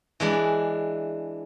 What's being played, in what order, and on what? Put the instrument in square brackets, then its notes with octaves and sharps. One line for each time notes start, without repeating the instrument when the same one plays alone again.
[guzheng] E3 G#3 D4 E4